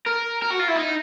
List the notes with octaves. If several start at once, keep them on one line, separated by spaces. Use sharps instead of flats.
A#4
A#4
F#4
F4
E4
D#4